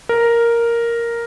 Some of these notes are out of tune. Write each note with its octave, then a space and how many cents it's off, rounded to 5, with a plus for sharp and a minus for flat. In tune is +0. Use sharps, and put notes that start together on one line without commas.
A#4 +0